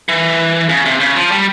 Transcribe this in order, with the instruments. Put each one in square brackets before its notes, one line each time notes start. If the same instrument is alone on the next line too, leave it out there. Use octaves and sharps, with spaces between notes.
[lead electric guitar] E3
C#3
C3
C#3
F3
G3